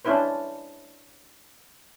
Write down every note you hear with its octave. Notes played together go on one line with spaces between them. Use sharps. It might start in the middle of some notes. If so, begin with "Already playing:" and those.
C#4 D4 E4 B4 C5